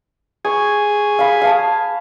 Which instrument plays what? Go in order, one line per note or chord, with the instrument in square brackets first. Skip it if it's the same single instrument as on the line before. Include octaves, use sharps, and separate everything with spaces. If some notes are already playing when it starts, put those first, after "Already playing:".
[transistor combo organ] G#4 [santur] C#6
[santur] F5 B5
F5 A5